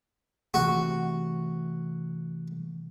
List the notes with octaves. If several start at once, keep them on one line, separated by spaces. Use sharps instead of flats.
C3 E3 A3 F#4